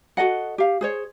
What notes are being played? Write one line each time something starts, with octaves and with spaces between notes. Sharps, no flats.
F#4 A4 D#5 F#5
G4 F5
G#4 C5 C#5